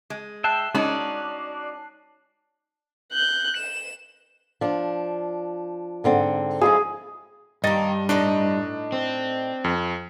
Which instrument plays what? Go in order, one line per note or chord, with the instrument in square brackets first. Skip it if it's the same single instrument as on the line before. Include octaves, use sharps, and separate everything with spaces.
[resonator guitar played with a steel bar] G#3
[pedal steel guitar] E5 G5 [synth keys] A5 F#6 C7
[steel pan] G#3 [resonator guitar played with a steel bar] C#4 D#4 [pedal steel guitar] F#4 D5
[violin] F#6 G6
E7
[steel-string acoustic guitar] F3 D4
G#2 D3 C4
[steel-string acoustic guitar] F3 G#3 E4 [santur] G#4
[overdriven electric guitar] G2 [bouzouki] D#3 A#3 [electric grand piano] D#5 A6
[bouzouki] A2 D#4 D#5 [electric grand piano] D4
[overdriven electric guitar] C4
[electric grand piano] F2